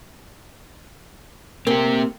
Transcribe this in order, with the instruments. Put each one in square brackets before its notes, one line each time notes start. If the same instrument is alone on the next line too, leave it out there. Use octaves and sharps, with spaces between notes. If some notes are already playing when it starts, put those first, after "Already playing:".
[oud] A#3 [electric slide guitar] C4 G4